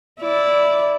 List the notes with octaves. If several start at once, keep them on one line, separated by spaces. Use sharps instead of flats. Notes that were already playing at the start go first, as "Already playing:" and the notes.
E4 D5